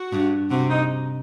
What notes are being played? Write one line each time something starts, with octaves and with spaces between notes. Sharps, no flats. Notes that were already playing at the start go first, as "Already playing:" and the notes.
Already playing: F#4
G2
C3 F#4
D#4